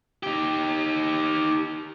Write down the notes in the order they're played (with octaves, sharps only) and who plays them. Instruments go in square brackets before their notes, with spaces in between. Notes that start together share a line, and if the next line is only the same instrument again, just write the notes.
[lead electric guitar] D#4 G4